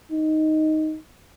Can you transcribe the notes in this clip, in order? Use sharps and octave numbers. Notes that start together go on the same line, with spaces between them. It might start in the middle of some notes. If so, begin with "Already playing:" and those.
D#4